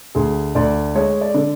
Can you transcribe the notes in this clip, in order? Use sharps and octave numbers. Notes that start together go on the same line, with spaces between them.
D2 G#4
D2 D5
G#3 C#5
D5
D3